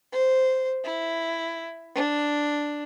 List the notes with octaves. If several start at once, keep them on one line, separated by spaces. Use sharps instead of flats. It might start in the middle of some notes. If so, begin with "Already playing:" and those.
C5
E4
D4